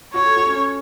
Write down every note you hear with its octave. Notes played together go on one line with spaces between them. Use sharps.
F#4 C#5
A4
F#4
C#4